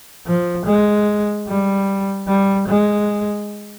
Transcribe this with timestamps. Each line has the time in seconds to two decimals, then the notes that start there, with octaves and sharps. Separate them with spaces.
0.27 F3
0.66 G#3
1.47 G3
2.28 G3
2.68 G#3